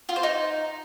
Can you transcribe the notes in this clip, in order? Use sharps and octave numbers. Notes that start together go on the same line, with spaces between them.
F4
C5
D#4